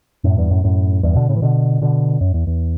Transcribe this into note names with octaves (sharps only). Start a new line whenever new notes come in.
F#2 A2
E2 G2
F#2 A2
F#2 A2
E2 G2
B2 D3
A2 C#3
E3
B2 D3
B2 D3
F#2
E2
E2